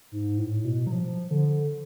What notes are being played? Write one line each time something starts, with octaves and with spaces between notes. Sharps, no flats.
G#2
A2
B2
F#3
F3
D3